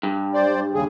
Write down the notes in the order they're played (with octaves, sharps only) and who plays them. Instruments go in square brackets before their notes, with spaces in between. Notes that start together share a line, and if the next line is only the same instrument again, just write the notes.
[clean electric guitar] G2
[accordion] C5 D5
D#2 C#3 G#4